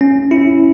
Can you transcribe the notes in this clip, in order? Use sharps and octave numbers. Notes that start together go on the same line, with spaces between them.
C#4
E4